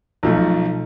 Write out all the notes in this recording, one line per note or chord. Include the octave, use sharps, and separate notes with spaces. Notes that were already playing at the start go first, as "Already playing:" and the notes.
B1 F3 A3